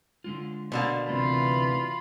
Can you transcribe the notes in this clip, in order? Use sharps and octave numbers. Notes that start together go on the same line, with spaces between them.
D3 G#3 F4
B2 D3 A#3 C5 A5
D2 C3 E3 A3 F4 B5